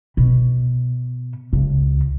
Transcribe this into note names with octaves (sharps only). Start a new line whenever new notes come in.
B2
C#2